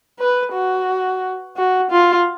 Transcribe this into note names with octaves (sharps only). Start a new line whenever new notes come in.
B4
F#4
F#4
F4